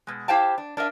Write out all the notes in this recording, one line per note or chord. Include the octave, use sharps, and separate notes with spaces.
B2 G#3
E4 G4 C5 F5 G5 A5
D4
D4 A#4 D#5 E5